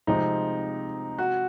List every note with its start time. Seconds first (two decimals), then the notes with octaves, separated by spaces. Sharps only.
0.07 C3 F3 G#3 C4 D#4
1.18 F#4